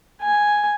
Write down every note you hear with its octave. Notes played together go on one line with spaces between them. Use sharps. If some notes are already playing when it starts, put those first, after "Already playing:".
G#5